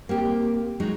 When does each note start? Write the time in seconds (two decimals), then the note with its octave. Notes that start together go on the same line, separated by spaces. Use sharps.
0.09 A#3 C4 G4
0.80 F#3 G#3 D#4